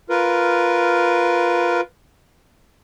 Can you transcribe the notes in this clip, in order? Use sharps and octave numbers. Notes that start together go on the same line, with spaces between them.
F4 A#4 B4